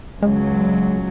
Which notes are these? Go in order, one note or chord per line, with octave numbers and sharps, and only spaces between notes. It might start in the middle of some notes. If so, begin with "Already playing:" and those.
C#2 F#3 G#3